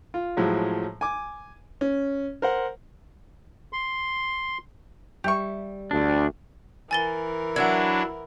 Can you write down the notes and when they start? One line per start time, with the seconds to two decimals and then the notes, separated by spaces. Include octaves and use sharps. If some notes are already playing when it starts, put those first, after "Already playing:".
0.14 F4
0.37 A2 F3 F#3 G#3
1.01 G#5 D6
1.81 C#4
2.42 A#4 C5 F#5
3.73 C6
5.24 G3 G4 E5 C#6
5.91 D2 D4
6.91 E3 A#4 G#5 A6 G7
7.56 F#3 D4 E4 F#5 G#6